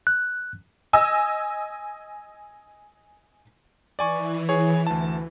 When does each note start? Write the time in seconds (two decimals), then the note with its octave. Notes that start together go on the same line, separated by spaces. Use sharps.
0.07 F#6
0.93 D#5 G#5 E6
3.99 E3 D5 G#5 C#6
4.49 G#4 C#5
4.87 D2 A5